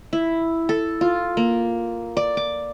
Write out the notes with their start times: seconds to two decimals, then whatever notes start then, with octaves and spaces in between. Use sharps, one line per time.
0.13 E4
0.69 A4
1.01 F4
1.37 A#3
2.17 D5
2.37 D6